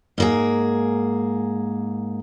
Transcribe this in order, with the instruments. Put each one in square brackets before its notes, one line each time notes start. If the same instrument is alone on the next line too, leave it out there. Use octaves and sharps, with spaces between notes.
[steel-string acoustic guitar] G#2 A#3 G#4